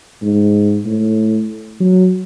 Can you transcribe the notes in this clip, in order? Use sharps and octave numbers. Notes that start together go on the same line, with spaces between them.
G#2
A2
F#3